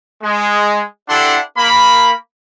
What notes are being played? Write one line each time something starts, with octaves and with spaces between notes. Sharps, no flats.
G#3
D4 E4 G4 A4 F#5 C6
A#3 B5